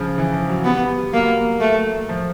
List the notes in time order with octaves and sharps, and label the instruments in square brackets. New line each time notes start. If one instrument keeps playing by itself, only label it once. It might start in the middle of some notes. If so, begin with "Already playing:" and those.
Already playing: [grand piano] C#3 F3
E3
F3
F#3
[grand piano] G3 [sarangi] B3
[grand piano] G3
G3
[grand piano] F#3 [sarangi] A#3
[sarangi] A3
[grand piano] F3